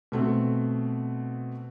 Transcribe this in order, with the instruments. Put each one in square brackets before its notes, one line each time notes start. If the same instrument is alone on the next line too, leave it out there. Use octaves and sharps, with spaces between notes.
[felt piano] B2 A3 C4